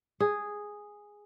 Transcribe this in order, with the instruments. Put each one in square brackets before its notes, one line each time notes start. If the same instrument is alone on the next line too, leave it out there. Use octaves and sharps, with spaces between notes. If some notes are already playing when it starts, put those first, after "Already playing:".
[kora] G#4